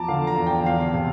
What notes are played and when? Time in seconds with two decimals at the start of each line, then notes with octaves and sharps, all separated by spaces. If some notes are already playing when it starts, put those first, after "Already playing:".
Already playing: E2 F3 A5 A#5 D6
0.08 D3 F5
0.27 A#5
0.37 E2
0.46 G5
0.66 E2 F5
0.94 C3